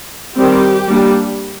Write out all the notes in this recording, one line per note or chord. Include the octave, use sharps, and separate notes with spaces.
D#3 G3 C4 G4
G3 A#3 D4